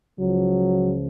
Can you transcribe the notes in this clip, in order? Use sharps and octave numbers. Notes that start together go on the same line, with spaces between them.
C#2 C#3 F3 F#3